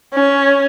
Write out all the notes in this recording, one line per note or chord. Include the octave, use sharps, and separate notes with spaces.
C#4